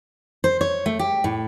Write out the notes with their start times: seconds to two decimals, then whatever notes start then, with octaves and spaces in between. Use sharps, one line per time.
0.44 C5
0.61 C#5
0.86 A3
0.99 G4
1.24 A2